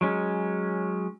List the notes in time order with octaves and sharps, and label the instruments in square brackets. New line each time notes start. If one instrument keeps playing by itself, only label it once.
[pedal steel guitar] F#3 G#3 C#4